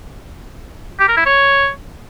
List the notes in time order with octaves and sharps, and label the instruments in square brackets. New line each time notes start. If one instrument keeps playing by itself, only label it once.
[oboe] G4
A#4
E4
C#5